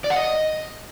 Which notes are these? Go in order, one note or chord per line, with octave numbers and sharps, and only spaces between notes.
D5
F#5
D#5